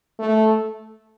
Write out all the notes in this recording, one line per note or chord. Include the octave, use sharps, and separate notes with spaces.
A3